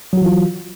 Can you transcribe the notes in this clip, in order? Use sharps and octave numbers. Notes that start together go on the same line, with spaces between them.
E3 F#3 F4 F#4